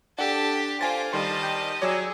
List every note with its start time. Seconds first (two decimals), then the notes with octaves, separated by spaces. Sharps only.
0.19 D4 G4 A4 F#5 A5
0.81 F4 C5 F5 G#5 D6 A6
1.13 D#3 G3 G4 D#5 A5 C6
1.43 G5
1.82 F#3 G#4 C#5 D5 E6